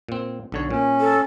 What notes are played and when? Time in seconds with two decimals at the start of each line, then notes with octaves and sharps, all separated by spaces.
0.09 A#2 C4
0.52 B1 D3 C#5
0.71 A#2 C#4
1.00 A4